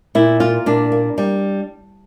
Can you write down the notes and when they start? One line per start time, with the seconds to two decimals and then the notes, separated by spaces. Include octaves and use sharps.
0.15 A#2 E4
0.40 A#3 F4
0.66 A#2 D4
0.92 A#3
1.18 G3